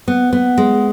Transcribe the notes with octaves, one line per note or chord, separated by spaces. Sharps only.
B3
B3
G#3